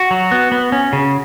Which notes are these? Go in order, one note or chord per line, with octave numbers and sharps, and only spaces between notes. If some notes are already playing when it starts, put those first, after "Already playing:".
Already playing: F#4
F#3
B3
B3
C#4
C#3